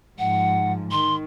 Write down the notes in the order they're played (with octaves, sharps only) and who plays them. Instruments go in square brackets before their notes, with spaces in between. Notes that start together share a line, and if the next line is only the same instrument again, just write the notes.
[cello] G#2 F3 [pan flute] F#5
[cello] D#3 [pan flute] C6